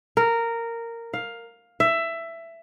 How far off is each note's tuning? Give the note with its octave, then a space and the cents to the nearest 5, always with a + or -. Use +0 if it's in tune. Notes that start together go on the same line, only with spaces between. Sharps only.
A#4 -10
F5 +10
E5 +15